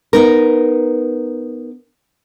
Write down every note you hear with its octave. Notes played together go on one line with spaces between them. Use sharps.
B3 D#4 A#4